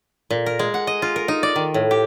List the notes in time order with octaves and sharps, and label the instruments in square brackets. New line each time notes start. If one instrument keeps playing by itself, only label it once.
[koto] A#2
A#4
G#3
F#5
D#5
F4
A#4
D#4
D5
D#3
A2
G4